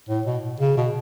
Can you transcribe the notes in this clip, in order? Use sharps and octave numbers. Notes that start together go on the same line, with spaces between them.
A2
B2
C#3
B2